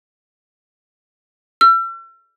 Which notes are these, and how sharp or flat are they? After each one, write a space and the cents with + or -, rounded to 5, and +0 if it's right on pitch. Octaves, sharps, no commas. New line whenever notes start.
E6 +40